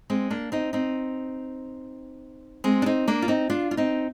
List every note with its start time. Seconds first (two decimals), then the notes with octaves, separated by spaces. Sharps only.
0.10 G#3 C4
0.30 A#3 D4
0.52 C4 D#4
0.73 C4 D#4
2.64 G#3 C4
2.82 D4
2.86 C4 D#4
3.08 A#3 D4
3.22 F4
3.28 C4 D#4
3.50 D4 F4
3.71 F4
3.77 C4 D#4